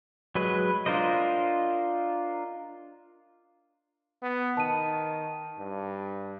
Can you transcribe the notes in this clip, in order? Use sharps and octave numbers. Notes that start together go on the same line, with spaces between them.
F#3 G#3 B4
D4 F4 A#4 C5 D#5
B3
D#3 A5 D#7
G2